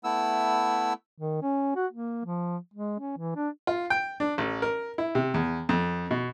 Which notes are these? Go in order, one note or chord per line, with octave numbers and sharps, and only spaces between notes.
A3 B3 E4 E6
D#3
C#4
F#4
A#3
F3
G#3
C#4
E3
D4
F4
G5
D4
A1
A#4
E4
C3
E2
F2
B2